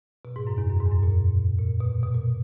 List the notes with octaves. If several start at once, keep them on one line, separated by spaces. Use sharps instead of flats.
B2
G#2
F#2
E2
F#2
G#2
E2
F#2
A#2
A#2
B2
B2
A#2